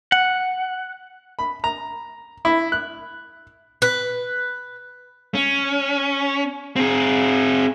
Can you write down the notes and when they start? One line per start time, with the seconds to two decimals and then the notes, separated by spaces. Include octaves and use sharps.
0.12 F#5
1.39 B5
1.64 A#5
2.45 E4
2.72 F#6
3.82 B4
5.35 C#4
6.76 C4 G#4